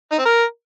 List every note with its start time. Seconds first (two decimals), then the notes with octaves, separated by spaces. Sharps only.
0.12 D#4
0.19 C4
0.25 A#4